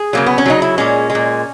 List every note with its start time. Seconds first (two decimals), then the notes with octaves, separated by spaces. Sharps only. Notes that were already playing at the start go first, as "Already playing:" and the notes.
Already playing: G#4
0.13 C#3 F#3 A#3
0.26 B3
0.38 C#4
0.46 C#3 F#3 D#4
0.62 E4
0.78 A#2 G#3 C#4
1.10 G#3
1.15 A#2